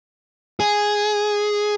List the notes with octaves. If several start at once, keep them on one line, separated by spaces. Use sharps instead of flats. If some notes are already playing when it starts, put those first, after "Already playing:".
G#4